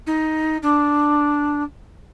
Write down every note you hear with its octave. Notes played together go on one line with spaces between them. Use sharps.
D#4
D4